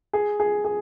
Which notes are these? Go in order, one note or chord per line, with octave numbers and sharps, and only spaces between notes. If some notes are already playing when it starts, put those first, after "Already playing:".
G#4
G#4
G#4